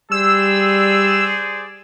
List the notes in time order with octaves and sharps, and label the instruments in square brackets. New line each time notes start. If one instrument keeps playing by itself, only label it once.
[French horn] G3 [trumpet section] G#4 C5 D5 [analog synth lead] E6